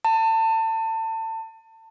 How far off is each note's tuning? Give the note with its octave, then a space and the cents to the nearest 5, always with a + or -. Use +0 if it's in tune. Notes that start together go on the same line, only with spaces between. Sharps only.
A5 +30